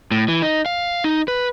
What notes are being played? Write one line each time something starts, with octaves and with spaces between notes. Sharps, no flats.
A2
E3
D#4
F5
D#4
B4